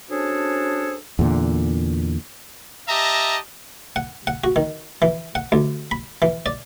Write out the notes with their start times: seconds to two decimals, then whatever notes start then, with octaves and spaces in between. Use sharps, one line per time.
0.10 C#4 D4 F#4 G#4 A4 C5
1.19 E2 A#2 D3
2.88 G4 D#5 E5 A5 A#5
3.96 F#5
4.27 F#5
4.44 F#4
4.56 D#3
5.02 E3
5.35 F#5
5.52 D2
5.91 B5
6.22 E3
6.46 D5